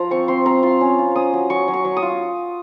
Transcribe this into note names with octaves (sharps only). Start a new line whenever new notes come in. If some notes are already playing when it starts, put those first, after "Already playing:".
Already playing: F3 F4 A#5
C4 C#6
C4 C6
C4 A#5
F4 C6
C#4
F4
C#4 D#6
F#3
F#3 C#6
F#3
C#6
F#3
D#6
F4